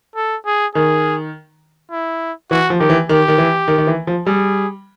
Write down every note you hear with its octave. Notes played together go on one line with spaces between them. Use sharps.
A4
G#4
D#3 G#4
E4
E3 F#4
F3
D#3 G4
E3
D#3 G4
D#3
E3
D#3
D#3
E3
F3
G3 G#4